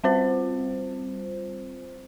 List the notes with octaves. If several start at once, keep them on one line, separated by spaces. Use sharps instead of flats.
G3 C4 F4 C5